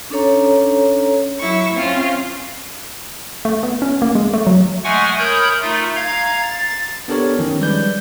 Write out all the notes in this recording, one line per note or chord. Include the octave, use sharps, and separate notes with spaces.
C#4 D4 A4 C#5 A#5
F#3 E4 E5 C#6
C4 C#4 F4 F5
A3
B3
C#4
A#3
G#3
A3
F#3
G#3 A3 F#5 G#5 C#6
A#4 C#5 B5 D#6 G6
A3 D#4 F4
F5 A#5 G#6
A6
B3 D4 G4 A4 A#4 C#5
D#3 F3 C#4
G3 G#3 B4 D5 G6